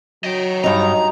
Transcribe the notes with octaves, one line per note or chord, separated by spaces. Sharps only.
F#3 D#5 G5
G2 D#4 A#5